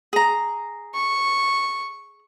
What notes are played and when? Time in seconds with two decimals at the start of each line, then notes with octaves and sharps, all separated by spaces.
0.13 G#4 A#5
0.94 C#6